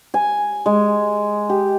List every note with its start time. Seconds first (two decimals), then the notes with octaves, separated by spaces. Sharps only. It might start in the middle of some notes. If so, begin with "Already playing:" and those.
0.14 G#5
0.66 G#3
1.49 G4